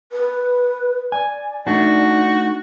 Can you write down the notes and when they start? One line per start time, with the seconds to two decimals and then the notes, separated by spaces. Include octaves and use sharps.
0.12 B4
1.12 D5 G#5
1.67 A3 D4 D#4 F#4